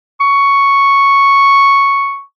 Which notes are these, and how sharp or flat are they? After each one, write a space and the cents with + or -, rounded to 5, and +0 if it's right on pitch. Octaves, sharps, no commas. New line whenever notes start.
C#6 +0